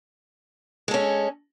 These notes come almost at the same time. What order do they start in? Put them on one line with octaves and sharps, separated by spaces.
G#3 A4 C#4